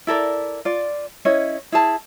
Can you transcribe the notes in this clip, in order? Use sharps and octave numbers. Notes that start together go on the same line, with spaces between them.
E4 A4 A#4 D5
F4 D5
C#4 E4 C#5 D#5
E4 G#4 A5